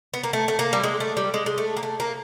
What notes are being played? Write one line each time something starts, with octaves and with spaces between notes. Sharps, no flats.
B3
A#3
A3
A3
A#3
G3
G#3
A3
G3
G#3
G#3
A3
A#3
A3
A#3